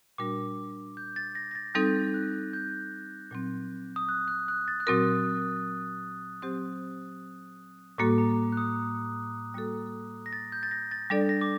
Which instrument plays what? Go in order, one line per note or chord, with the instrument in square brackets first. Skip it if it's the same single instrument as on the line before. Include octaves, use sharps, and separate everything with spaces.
[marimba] A#2 G3 D4 F#4 A#4 [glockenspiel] D6
[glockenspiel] G6
A6
A#6
A#6
A6
[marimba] G3 C4 D#4 A4 [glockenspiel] G6
[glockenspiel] F#6
G6
[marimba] A#2 F#3 C4
[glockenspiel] D#6
F#6
F#6
F#6
A6
F#6
[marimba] A#2 F#3 C4 F#4 A#4 [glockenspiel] D#6
[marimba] F#3 C4 G4 C5
[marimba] A2 G3 A#3 F#4 A4 [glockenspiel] D6
[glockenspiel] A#5
F#6
D#6
[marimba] G3 A#3 F#4 A4
[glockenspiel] A#6
A6
G6
A6
A#6
A6
[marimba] G3 D4 A4 D5 [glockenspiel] A6
[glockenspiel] A#6
D6